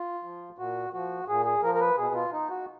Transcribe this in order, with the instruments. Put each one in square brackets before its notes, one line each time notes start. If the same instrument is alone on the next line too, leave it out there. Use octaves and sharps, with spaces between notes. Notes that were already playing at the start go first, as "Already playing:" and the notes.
Already playing: [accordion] F4
F3
A#2 F#4
F3 F#4
A#2 G#4
G#4
F3 A#4
A#4
B4
B2 G#4
F4
D#4
F#4